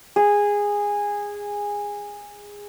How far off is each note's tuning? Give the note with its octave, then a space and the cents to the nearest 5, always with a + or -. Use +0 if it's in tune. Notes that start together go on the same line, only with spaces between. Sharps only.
G#4 -15